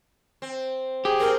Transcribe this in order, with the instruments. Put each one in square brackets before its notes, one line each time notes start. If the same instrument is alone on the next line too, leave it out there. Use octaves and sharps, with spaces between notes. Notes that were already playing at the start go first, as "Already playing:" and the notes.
[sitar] C4
[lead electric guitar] G4 [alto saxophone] G#4
[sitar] C4 [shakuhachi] A#4